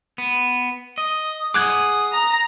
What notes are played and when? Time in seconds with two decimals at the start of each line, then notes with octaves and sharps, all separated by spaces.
0.18 B3
0.98 D#5 D#6
1.54 G#4 F#5 D6 D#6 F#6 G#6
2.13 A#5